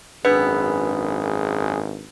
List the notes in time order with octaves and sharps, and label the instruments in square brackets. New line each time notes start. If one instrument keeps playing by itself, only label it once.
[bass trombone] G#1 [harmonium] F#2 G#4 [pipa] B3 [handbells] D4 B4